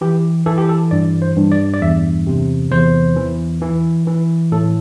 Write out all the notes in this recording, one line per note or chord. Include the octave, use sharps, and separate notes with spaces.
E3 G4
E3 A4
G4
A4
G2 D5
C5
G2
D5
D5
E2 E5
C3
E2 C5
E3
E3
E3
A2 A4